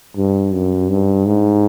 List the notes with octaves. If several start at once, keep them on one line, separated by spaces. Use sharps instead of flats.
G2
F#2
G2
G#2